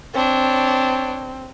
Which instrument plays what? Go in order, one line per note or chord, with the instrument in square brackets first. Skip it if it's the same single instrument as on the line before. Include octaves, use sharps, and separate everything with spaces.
[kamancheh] C4 [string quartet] D4 C#5